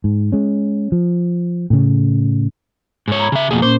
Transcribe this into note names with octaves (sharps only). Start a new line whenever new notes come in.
G#2
G#3 C#4
F3
A2 C#3
G#2 C#5
A#5 B5 G#6
C#3 E5
F2 B2 A#3 G#4
A#2 C#4 C5